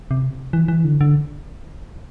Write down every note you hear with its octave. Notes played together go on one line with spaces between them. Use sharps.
C3
E3
E3
D3
D3